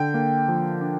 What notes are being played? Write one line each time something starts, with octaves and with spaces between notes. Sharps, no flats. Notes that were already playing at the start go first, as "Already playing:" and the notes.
Already playing: D3 G5
A#3
F3
D4